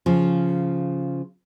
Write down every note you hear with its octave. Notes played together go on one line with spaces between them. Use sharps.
C#3 F3